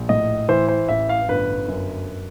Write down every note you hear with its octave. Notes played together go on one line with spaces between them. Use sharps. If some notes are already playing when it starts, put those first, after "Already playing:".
Already playing: A#1
A2 D#5
E3 C5
C5
A1 E5
F5
G1 B4
F#2